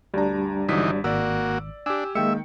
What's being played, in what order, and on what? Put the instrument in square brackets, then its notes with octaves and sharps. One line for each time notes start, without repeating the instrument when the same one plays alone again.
[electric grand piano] D2 A#5 [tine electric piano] G3 D4
[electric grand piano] G#1 F#3 B6 [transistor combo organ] D3 E3 D#4
[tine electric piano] G#1 [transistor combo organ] A#3 F#4 [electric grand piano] D5 E6
[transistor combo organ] D4 [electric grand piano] G4 G#5 [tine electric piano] E6
[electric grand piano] D#3 G5 C#7 [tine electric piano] G#3 A#3 [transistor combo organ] E5